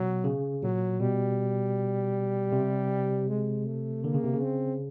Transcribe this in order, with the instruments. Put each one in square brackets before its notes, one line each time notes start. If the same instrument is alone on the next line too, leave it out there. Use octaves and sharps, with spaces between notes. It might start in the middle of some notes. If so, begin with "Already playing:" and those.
Already playing: [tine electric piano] B2 [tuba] F#3
[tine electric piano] C#3
[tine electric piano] A#2 [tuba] F#3
[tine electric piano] B2 [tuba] G3
[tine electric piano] C3
[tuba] G#3
A3
[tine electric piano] D3 [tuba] A#3
[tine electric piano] C#3
C3
C#3
[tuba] C4